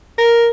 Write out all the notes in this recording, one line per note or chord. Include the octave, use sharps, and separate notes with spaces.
A#4